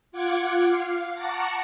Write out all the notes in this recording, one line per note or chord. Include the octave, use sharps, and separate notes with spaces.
F4 F#5 D6 G#6
F5
F#5 A5 A#5 C#6 D6